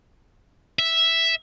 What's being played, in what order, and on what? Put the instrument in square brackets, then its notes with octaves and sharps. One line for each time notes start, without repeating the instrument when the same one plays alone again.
[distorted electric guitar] E5